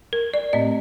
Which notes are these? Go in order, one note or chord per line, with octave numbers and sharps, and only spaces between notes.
A#4
D5
A2 A3 C4 D#5